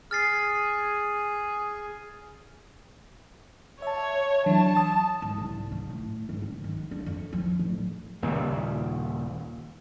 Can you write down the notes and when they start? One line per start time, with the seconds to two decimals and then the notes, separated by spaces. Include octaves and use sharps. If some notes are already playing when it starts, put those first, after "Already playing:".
0.11 G#4 F6 A6 C7
3.82 C#5 E5 A5
4.46 E3 F#3 D4 A5
4.77 D#6
5.22 G#2
5.38 C2
5.71 G#2
5.90 A2
6.29 G#2
6.42 C#3
6.64 D#3
6.91 D4
7.06 F2
7.33 F3
7.59 D1
8.22 D#2 A#2 C#3 G3